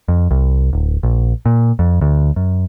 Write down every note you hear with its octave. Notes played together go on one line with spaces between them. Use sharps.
F2
C2
D1
A#1
A#2
F2
D2
F#2